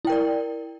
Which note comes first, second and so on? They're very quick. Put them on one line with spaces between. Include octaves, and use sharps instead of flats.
E4 G5 A#4 D5